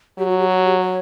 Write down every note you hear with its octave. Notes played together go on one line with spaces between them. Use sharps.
F#3 G4
F#4
G4
F#4
G4
C#5